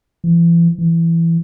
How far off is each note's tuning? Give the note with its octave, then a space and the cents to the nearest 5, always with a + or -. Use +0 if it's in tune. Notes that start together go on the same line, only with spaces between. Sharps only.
E3 +40
E3 +15